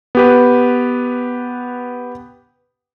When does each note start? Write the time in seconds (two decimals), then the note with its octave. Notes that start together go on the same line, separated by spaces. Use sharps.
0.15 B3 G4 B4